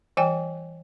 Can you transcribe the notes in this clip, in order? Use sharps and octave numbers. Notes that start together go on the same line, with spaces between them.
E3 G3 G5 G#5